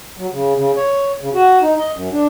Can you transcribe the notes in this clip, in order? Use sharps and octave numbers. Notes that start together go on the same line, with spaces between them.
F#3
C#3
C#3
C#5
C#3
F#4
D#4
D#5
F#2
D4